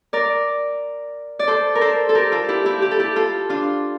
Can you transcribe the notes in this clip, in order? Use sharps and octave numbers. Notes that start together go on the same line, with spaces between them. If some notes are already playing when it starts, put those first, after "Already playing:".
A#4 D5
D5
A4 C5
A#4
A4 C5
A4
G4 A#4
F4 A4
E4 G4
E4 G4
G4
A4
E4 G4
F4 A4
D4 F4